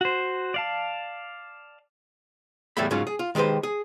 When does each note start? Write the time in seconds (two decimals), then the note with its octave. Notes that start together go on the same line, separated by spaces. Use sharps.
0.01 F#4 C5
0.54 D5 F5 A5
2.77 E2 A2 G3 A3 E5 B5
2.91 G#2 C#3 F#3 C#4 F4
3.07 G#4
3.19 F4
3.35 D#3 G#3 G4 B4 C5
3.63 G#4